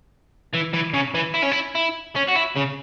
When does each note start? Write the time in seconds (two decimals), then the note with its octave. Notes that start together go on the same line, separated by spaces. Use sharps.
0.53 E3
0.73 E3
0.93 C#3
1.15 E3
1.35 E4
1.43 C#4
1.52 E4
1.75 E4
2.16 C#4
2.28 F#4
2.36 E4
2.56 C#3